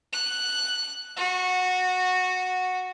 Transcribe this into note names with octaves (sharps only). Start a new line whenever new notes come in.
F#6
F#4